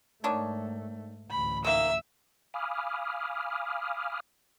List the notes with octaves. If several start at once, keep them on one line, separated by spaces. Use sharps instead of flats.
G#2 D#3 A3 D4 C#5
A1 D2 B5
D#3 A#3 E5 E6
F5 G#5 B5 D6 D#6 F6